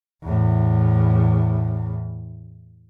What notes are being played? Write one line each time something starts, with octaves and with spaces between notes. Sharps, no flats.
E2 A2